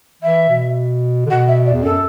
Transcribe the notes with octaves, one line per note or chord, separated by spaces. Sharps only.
E3 E5
B2
D3
B2 F#5
E5
D5
E2
F#2 A4